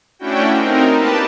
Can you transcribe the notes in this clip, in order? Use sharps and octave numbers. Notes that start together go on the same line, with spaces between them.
A3 C#4 D4 E4 F#4 G5
C4 D#4 A#4
A#3 G4 B4 A5